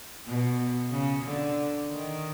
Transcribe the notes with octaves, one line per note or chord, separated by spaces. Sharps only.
B2
C#3
D3
D#3